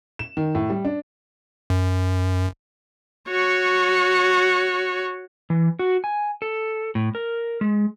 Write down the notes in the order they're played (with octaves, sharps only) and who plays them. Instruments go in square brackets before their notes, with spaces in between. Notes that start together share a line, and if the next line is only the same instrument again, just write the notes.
[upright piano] E7
D#3
A2
G3
D4
[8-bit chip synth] F#2
[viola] F#4 C#5
[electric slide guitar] E3
F#4
G#5
A4
A2
A#4
G#3